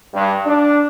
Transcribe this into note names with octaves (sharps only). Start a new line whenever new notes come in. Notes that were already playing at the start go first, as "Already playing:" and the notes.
G2
D4